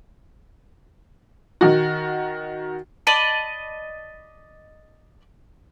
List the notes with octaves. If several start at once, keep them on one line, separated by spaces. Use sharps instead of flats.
D#3 F#4
D5 D#5 A5 B5